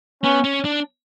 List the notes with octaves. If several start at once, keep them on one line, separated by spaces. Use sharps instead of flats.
B3 C#4
C#4
D4